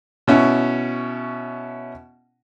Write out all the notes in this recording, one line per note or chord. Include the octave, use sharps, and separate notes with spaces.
B2 C#4 E4